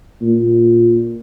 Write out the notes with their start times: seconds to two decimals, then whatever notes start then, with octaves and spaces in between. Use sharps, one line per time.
0.22 A#2